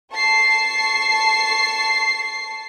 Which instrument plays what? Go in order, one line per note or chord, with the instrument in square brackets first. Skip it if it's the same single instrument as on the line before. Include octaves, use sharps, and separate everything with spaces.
[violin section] A5 C#6 C7